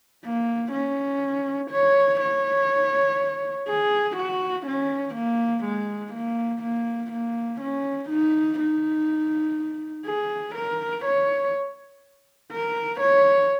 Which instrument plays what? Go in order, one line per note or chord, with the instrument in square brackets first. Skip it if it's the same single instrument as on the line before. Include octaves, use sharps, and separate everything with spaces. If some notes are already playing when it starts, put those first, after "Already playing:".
[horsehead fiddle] A#3
C#4
C#5
C#5
G#4
F#4
C#4
A#3
G#3
A#3
A#3
A#3
C#4
D#4
D#4
G#4
A#4
C#5
A#4
C#5